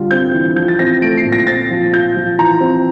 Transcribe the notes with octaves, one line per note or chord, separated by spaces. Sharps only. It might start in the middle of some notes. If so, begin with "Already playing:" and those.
Already playing: D3 G3 F4
C4 G6
E3
F3 G6
A6
C4 A#6
A3 D7
C7
A#2
A#6
C4 A6
F3
F4 G6
F3
E3 A#5
C4